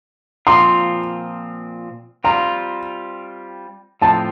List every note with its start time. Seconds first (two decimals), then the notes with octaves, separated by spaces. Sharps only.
0.47 A#2 F3 C4 F4 C6
2.24 G3 C4 F4 A#5
4.01 A2 F3 C4 A5